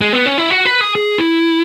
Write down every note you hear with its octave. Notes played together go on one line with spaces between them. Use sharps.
G#3
B3
C#4
E4
F#4
B4
G#4
G#4
E4